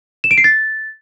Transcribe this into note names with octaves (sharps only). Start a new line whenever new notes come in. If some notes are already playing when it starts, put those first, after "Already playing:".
E7
D7
C7
A6